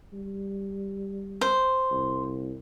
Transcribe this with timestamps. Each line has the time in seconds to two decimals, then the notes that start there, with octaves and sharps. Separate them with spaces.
0.13 G3
1.41 C5
1.91 C2